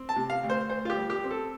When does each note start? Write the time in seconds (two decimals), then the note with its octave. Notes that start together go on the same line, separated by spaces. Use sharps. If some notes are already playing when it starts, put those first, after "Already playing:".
Already playing: C4
0.09 A5
0.16 C3
0.30 F5
0.43 D2
0.50 C5
0.70 D2 C5
0.85 F4
0.90 G4
0.97 G3
1.10 G4
1.24 C4
1.31 A4